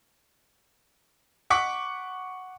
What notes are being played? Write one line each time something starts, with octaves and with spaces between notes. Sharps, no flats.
F#5 C#6 D6 B6